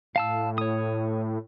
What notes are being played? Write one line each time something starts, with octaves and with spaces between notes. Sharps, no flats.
A2 F5 A5 E6
C#5 D#6